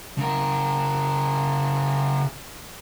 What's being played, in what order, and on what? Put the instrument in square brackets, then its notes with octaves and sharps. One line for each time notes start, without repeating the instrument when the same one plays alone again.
[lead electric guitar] C#3 A#4